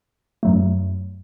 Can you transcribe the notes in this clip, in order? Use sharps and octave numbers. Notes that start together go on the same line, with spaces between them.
F#2 F#3 A3